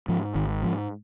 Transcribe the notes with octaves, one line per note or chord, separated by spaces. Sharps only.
G#2 F3
G#1 D#3
G#2 F3